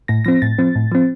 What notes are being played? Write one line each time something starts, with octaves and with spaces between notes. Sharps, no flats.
A2 A#6
F3 C4 A#6
A2 A6
F3 C4
A2
F3 C4